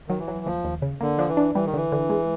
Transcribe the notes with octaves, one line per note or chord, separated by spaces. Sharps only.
D#3 F#3
E3
F#3
D#2 F3
D#2
C#3
D3 A#3
F3 D4
E3
D4
E3 G3
D#3
D3 E3
D3
G#3